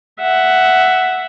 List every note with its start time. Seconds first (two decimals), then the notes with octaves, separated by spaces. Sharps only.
0.21 E5 F#5